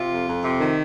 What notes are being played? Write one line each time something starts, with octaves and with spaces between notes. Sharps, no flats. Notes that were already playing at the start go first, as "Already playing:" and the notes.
Already playing: C3 F4
F2
F2
C3
D#3